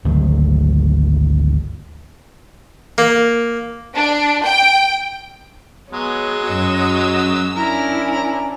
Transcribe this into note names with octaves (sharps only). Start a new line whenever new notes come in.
G#1 D2 D#3 F#3
A#3
D4
G5
F#3 G#3 B3 G#4 C#5
F#2 F#4 D#5 E6
C#4 D4 E4 A#4 A#5